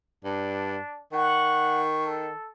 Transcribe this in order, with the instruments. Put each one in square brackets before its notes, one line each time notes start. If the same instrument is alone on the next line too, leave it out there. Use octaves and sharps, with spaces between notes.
[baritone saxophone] G2 [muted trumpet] D4
[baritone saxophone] D#3 [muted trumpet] F#5 [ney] C#6
[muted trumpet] A4